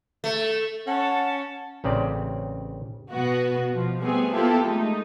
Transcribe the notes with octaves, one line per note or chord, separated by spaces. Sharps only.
A3
C#4 F#5 A5
A1 C#3 C4 D5
B2 B3 F#4
B2 F3
G3 A3 B3 C4 G#4
A#3 B3 E4 F4 G4 A4
G#3 A3 D#4